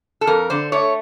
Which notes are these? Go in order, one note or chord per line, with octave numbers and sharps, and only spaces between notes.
A4
F2 A#4
D3 C5
A3 C#5